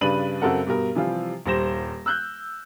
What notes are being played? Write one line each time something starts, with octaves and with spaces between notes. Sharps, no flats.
G2 C#3 D4 B4 D#7 F#7
F#2 C#3 C4 A4 A#4 F#5
G2 B2 A#4
C3 E3 F3 G3 F4
D#1 G2 C5 A#6 E7
E6 F#6 G6